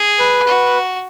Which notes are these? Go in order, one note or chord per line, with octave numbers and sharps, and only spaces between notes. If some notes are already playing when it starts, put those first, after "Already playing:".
Already playing: G#4
B4
F#4